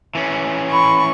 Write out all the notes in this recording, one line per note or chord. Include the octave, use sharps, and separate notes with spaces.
E3 C#4
B5 C#6